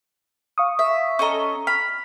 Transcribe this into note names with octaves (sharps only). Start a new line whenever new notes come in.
F5 C#6 D#6
E5
C#4 A4 D#5 A#5 C#6
B5 F6